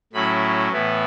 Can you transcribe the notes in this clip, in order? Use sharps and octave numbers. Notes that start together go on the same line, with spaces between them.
A2 F#3 C#4 E4 B5
A2 E3 B3 E4